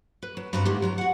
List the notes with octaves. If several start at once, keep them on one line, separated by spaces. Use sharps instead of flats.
B4
F#3
G2 C4 F#4 B4 C5 A#5
D3 G#3 D#4 E4 G4
F#3 F4 A#5
F#4 F#5